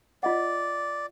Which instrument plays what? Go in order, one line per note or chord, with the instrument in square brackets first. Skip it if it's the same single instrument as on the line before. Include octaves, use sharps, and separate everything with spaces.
[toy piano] F4 D#5 F#5 [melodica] D5